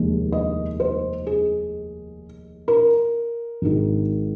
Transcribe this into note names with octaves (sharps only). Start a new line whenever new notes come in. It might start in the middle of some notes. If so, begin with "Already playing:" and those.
Already playing: F1 D#2 D#3 G#3
D#5
C5
G#4
A#4
G#1 G#2 D#3 G#3